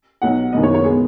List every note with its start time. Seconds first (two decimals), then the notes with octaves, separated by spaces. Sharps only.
0.22 B1 B2 F#3 F#5
0.53 F#1 F#2 D#3 B3 D#5
0.63 C#5
0.74 C#5
0.84 B2 G#3 B3 G#4